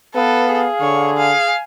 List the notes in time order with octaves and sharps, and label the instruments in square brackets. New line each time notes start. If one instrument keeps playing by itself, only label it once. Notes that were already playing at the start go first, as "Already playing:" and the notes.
[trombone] B3 [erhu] A4 [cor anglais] B4 [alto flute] F5
[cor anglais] G#4
[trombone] D3 [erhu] C#5
[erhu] F5 [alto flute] G#5